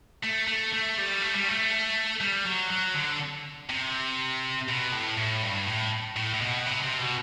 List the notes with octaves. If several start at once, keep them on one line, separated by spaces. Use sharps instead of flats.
A3
A3
A3
G3
A3
G3
A3
G3
F#3
F#3
D3
C3
B2
A2
A2
G2
A2
A2
A2
B2
C3
C3
B2